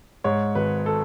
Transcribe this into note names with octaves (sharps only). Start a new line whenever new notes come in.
G#2 C#5
G#1 B4
A4